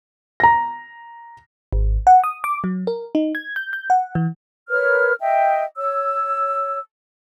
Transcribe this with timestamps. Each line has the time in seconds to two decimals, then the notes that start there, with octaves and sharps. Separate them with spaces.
0.40 A#5 A#6
1.73 G#1
2.07 F#5
2.24 D#6
2.44 D6
2.64 F#3
2.87 A#4
3.15 D#4
3.35 G#6
3.56 G6
3.73 G6
3.90 F#5
4.15 E3
4.69 A#4 B4 C#5 F6
5.20 D#5 E5 G5
5.77 C#5 E6